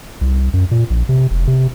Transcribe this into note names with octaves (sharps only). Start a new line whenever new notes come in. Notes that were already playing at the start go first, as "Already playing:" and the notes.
C2
F#2
A#2
A#1
C3
F1
C3